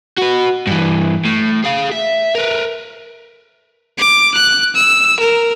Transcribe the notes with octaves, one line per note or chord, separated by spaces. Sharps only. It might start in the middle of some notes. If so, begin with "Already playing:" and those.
F#4 B4
G2 E3
A2
G#4 F5
E5
A#4 B4
D6
F#6
E6
A#4